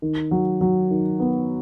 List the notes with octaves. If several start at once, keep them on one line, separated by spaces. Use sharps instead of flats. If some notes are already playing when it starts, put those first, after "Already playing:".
D#3
F#3
F#3
D#3
B3